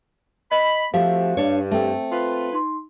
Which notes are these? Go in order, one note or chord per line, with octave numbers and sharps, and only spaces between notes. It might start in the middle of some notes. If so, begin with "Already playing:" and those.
D#5 B5
F3 A3 C4 F#4 G4 E5 F5
G2 D4 C#5
A3 C4 E5 G5
F4 B4
D#4 C6